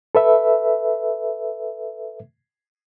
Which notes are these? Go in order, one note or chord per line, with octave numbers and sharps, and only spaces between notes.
A4 B4 E5